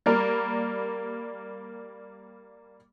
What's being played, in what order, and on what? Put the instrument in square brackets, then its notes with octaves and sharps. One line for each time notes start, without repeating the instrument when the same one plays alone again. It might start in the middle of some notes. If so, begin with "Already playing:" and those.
[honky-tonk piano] G3 A#3 A#4